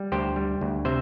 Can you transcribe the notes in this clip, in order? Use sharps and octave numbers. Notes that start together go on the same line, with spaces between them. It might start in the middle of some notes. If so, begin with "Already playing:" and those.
Already playing: G3
D2 G4 C5
G3
D2
C3 C5 E5